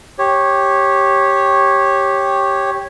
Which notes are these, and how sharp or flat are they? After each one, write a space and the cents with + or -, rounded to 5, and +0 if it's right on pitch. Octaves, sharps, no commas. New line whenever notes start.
G4 +0 C#5 -15